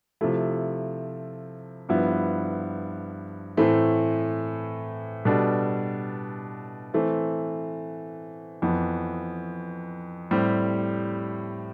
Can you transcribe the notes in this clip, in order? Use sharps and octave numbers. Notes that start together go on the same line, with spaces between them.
C3 F3 A3 E4
G2 F3 B3 E4
A2 E3 A3 C4
B2 G3 D4 A4
E3 A3 C4
F2 E3 B3
A2 G3 C4 G4